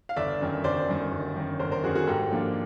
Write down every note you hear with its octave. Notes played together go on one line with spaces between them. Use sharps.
F5
G1 D5 E5
F#2 D#3
G1 C5 D5
F#2 D#3
G1
F#2 D#3
G1 A#4 C5
A#4 C5
F#2 D#3 F#4 G#4
F#4 G#4
G#2 G4 A4
F3 A#3 D4 F4